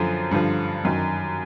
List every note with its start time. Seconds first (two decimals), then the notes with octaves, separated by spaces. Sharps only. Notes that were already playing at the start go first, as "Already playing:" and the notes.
Already playing: F#2 D3 F3
0.31 G2 D3 F3
0.84 F#2 D#3